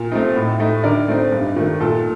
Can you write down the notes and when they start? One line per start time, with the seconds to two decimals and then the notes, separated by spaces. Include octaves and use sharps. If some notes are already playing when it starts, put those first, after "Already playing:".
Already playing: A#2
0.12 A3 C4 D#4
0.36 A2
0.60 A3 D#4
0.84 D3 A#4 D5
1.08 A3 C4 D#4
1.32 G2
1.56 D#3 A3
1.80 A#2 A4